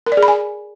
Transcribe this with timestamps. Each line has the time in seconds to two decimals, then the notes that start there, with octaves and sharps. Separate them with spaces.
0.06 A#4
0.12 D5
0.17 G#4
0.23 B5
0.28 G#5